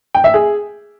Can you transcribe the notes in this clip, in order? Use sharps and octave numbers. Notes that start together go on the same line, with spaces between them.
G5
E5
G#4